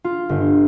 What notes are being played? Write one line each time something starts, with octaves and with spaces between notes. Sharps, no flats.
F4
G1